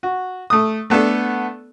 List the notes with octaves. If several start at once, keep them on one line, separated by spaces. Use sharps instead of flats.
F#4
A3 D#6
A3 B3 D4 A4